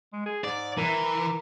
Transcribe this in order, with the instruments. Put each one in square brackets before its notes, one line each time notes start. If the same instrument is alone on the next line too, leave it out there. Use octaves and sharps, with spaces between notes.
[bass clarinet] G#3
G#4
[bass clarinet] G#2 [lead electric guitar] D5
[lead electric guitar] E3 [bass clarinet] A#4